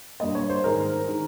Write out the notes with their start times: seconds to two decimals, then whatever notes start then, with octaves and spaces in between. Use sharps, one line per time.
0.20 G2 G3 A#3 D#5
0.35 C#5
0.50 C5
0.64 G#2 D#3 G#3 A#4
1.08 D#3 G#3